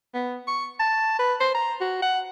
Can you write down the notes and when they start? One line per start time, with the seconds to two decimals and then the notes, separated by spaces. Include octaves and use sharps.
0.14 B3
0.48 C#6
0.80 A5
1.19 B4
1.40 C5
1.55 A#5
1.81 F#4
2.02 F#5